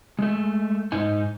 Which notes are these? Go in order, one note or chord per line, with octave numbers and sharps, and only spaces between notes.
G#3 A3
G#2 D#4 G#5